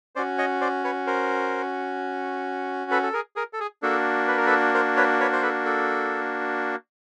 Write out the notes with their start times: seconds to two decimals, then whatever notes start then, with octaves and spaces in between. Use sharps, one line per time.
0.15 C#4 F#4 C5 D5
0.38 C#5 D#5
0.61 C5 D5
0.84 B4 C#5
1.07 A#4 C5
2.91 A4 B4
3.03 A4
3.13 G#4 A#4
3.36 G#4 A#4
3.53 A4
3.60 G#4
3.82 A#3 D4 F#4 A4
4.28 B4
4.37 A#4
4.46 A4 B4
4.74 A#4 C5
4.97 B4 C#5
5.20 B4 C#5
5.32 C5
5.42 A4 B4
5.65 A4